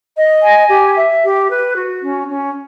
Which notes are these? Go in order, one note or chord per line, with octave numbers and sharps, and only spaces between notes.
D#5
G#5
G4
E5
G4
B4
F#4
C#4
C#4